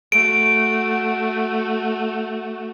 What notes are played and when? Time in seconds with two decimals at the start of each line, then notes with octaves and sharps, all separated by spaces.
0.12 A3 F#4 D7